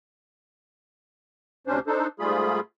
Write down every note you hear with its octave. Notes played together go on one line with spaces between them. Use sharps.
D2 C3 C#4 D4 C5
D4 D#4 A4 C5
G#2 G3 A3 F4 G#4 B5